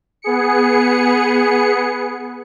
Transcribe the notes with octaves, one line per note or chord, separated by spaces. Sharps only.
B3 G#4 C#7